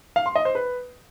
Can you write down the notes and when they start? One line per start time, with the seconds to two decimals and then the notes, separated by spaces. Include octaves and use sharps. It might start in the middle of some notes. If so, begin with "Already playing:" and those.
0.16 F5
0.26 C6
0.36 D#5
0.45 C5
0.55 B4